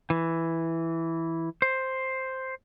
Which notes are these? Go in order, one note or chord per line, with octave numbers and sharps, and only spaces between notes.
E3
C5